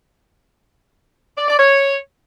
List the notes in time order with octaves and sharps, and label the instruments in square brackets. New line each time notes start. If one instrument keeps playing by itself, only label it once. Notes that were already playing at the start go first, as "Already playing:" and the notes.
[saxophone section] D5
D5
C#5